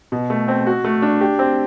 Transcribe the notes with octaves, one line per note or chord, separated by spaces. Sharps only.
B2
A3
C4
F#4
A3
D4
G4
C4